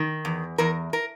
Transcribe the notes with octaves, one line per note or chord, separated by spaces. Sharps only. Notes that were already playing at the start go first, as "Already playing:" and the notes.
Already playing: D#3
E2
E2 A#4
A#4